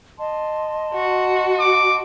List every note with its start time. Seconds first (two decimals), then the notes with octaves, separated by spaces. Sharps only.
0.18 D#5 A5 C6
0.94 F#4
1.59 D6